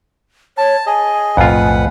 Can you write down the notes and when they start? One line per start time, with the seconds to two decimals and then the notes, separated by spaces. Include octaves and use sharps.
0.58 C#5 A5
0.87 G#4 D#5 G#5
1.37 B1 F2 A2 A3 F4 B4 F#5